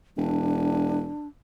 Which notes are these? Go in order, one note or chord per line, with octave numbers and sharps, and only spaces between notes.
E1 D4